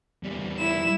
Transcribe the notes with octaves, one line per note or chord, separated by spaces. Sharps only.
E2 G3
E4 E7